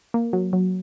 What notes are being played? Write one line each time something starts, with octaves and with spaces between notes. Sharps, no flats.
A#3
F#3
F#3